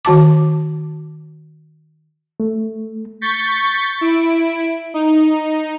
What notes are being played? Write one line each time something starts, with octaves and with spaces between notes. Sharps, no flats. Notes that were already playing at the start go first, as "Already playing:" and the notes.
D#3 F#4 A5 D6
A3
C#6 G6 A6 B6
E4 D7
D#4